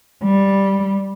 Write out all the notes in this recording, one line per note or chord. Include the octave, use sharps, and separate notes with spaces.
G3